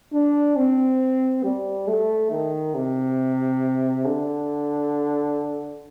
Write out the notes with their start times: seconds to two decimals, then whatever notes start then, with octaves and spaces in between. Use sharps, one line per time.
0.12 D4
0.56 C4
1.43 G3
1.87 A3
2.31 D#3
2.75 C3
4.05 D3